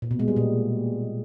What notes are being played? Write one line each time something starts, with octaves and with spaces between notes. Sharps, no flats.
A#2
B2
G#3
G3
A#2